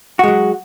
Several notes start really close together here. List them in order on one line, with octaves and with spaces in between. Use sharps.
F#4 G#3 F#3